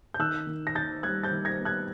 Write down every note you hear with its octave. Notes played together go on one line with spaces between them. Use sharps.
G6
D#3 E6 F#6
D#3
A#6
D#3 G6 A6
G3 F#6 G#6
G6 A6
D#3
G#6 A#6
B3
F#6 G#6